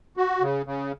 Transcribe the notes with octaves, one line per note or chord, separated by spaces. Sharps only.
F#4
C#3
C#3